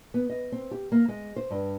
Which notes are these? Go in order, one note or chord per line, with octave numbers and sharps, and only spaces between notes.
B3
D#5
C4
G4
A#3
G#3
C5
G2